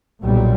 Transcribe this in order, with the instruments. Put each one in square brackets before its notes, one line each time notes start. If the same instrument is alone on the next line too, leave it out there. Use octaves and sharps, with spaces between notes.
[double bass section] B1 A#2 G3